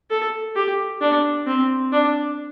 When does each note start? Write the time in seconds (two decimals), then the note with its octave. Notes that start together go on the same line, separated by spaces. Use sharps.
0.10 A4
0.56 G4
1.01 D4
1.47 C4
1.93 D4